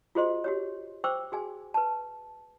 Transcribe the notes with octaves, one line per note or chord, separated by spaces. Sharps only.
F4 F#4 G#4 C5 D#5 C6
F#4 G4 C#5
C5 G5 C#6 D6 E6
F#4 G#4 G#5
B4 A5